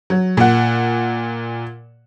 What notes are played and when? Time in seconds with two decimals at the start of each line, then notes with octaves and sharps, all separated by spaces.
0.10 F#3
0.37 A#2 F#5